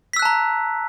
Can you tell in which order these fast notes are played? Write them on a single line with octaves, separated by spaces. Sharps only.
B6 E6 F#6 A5 A#5